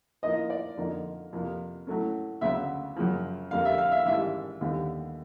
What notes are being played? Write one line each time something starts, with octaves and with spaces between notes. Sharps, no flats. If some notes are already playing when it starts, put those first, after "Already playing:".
A2 F3 A#3 D#4 D#5
D5
F2 D3 F3 A#3 D#4
F2 C3 F3 A#3
A2 F#3 A3 C#4
D2 C#3 F#3 B3 E5
F#2 C#3 F3
F2 D3 G3 A#3 F5
E5
F5
E5
A1 G#2 D#3 G3 E5
D#2 D3 G3 B3